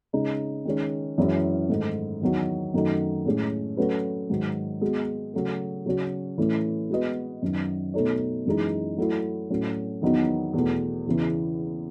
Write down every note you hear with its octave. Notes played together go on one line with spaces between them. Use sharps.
C#3 G#3 D#4
D#3 G#3 C#4
F#2 E3 G#3 C#4 E4
G#2 D#3 A3 D#4
E2 D#3 F#3
F#2 D#3 F#3 A3 D#4
A2 G#3 C#4 G#4
F#3 A3 C#4 F#4 B4
G#2 D#3 F#3
G#3 B3 F#4
C#3 F#3 A3
C#3 F#3 C#4 F#4
A2 E3 A3 C#4
G#3 B3 F#4 B4 D#5
F#2 D#3 F#3
B2 A3 D#4 A4 C#5
F#2 E3 G#3 D#4
F#3 A3 E4
A2 F#3 A3 C#4
E2 D#3 F#3 B3 D#4
E2 B2 A3
E2 C#3 E3